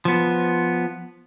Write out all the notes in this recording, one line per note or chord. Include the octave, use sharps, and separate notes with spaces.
F3 B3